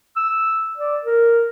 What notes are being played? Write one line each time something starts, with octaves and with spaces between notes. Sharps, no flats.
E6
D5
A#4